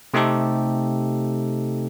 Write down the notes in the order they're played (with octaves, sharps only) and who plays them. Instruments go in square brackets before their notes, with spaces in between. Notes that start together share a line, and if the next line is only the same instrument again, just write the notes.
[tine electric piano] C3 A3 C4 D#4 G4 A4